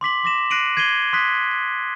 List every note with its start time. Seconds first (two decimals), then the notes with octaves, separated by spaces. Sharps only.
0.01 C6 D6 B6 F#7
0.23 C6 D6 A#6 E7
0.50 F#6 A#6 C7 D7 D#7 F#7
0.77 G#6 C7 D#7 F#7 G7
1.13 C6 D#6 F#6 B6